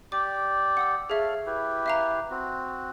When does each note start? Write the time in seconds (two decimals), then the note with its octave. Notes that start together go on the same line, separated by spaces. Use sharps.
0.12 G4 D5 D6
0.77 F#5 D#6 E6
1.10 G#4 A4 C#5 E5 F5
1.46 E4 G4 B4
1.86 E5 F5 A#5
2.30 C4 F#4